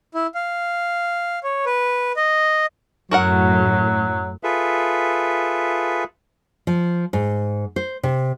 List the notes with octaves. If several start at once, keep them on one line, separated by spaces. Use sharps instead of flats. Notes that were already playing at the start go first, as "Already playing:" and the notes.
E4
F5
C#5
B4
D#5
F#2 A2 F#3 F#4 A#4 F#5
F4 G#4 A4 B4 E5
F3
G#2
C5
C3